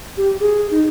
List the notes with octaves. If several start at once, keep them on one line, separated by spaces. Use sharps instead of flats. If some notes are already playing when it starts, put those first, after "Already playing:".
G4
G#4
D#4